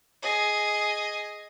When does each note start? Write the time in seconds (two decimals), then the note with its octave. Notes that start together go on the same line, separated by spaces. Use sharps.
0.22 G#4 D#5